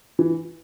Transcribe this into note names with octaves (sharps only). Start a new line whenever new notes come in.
E3